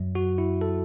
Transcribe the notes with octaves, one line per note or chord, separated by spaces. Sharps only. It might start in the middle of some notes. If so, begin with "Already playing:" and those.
Already playing: F#2 F#3
F#4
E4
A4